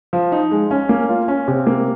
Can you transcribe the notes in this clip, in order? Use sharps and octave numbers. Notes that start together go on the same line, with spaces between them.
F3
D#4
G#3
C#4
A#3
F4
C#4
C3
A#3